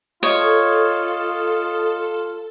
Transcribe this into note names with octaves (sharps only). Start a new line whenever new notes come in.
F4 A4 C#5 D#5 D#6